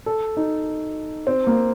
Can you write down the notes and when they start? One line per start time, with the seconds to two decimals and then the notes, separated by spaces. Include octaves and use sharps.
0.06 A4
0.37 D#4
1.27 C4
1.47 A#3